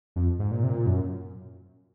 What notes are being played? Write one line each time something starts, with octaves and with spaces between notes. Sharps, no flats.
F2
G#2
A#2
C3
A#2
F#2